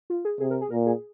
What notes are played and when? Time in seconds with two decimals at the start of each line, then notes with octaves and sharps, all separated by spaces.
0.10 F4
0.25 G#4
0.40 C3 G#4
0.51 A#4
0.61 G#4
0.71 A#2 A#4
0.86 G#4